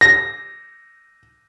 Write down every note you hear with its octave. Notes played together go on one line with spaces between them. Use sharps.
A#6